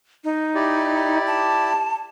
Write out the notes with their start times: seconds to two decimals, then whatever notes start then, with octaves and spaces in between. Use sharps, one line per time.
0.24 D#4
0.55 E4 G4 D5
1.27 A5